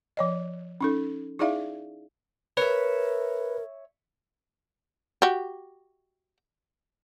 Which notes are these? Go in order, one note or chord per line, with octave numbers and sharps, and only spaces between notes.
F3 C#5 D#5
C#4 D#4 A4
D#4 E4 G#4 D5 E5 F5
A#4 B4 C#5 E5
F#4 G4